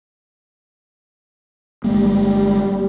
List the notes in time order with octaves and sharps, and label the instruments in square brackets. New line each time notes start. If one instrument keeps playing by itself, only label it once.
[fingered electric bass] G1 G#3 A#3 [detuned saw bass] G3